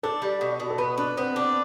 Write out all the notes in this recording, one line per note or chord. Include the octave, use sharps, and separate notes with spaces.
D4 A4
G3
B2
B2
A4
B3 B4
B3 D4
B3 C4
D4